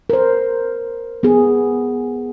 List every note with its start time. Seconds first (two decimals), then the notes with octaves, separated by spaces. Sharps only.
0.10 A#4 C5
1.23 B3 G#4